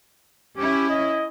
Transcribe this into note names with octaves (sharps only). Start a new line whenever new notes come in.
C#4 E4 G4
D#5